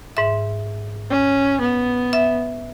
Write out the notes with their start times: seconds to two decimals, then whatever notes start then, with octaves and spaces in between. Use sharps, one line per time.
0.17 G#2 E5
1.10 C#4
1.61 B3
2.13 E5